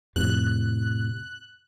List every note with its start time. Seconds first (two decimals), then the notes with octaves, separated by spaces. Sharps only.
0.16 F2 A2 C3 F#6